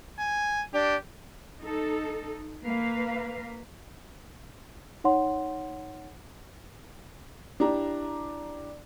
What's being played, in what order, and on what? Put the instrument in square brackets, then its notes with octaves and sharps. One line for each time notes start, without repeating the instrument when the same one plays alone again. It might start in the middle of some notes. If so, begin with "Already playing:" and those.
[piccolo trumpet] G#5
[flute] D4 [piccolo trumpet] G4
[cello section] D#4 A4
A#3 A#4 B4 F5
[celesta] D#4 C#5 F#5 C6
[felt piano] D4 E4 G4 A#5